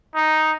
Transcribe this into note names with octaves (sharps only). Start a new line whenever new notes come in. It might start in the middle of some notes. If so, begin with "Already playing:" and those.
D#4